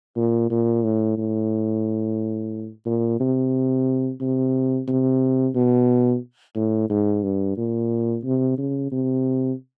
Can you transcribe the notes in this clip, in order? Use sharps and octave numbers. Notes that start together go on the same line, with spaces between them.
A#2
A#2
A2
A2
A#2
C3
C3
C3
B2
A2
G#2
G2
A#2
C3
C#3
C3